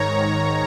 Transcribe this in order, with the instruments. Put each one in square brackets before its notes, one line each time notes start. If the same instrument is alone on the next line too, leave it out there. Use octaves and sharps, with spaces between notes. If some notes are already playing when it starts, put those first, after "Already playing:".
Already playing: [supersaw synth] G#2 D#3 C#5 A#5